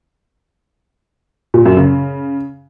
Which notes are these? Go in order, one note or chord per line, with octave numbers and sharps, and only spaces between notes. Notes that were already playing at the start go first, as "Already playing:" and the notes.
A#2
F#2
C#3